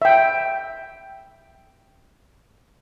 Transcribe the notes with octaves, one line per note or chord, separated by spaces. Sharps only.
E5 G5